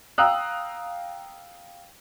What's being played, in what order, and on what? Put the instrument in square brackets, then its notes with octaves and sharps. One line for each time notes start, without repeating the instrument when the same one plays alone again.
[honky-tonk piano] F5 G5 A#5 D#6 E6 F#6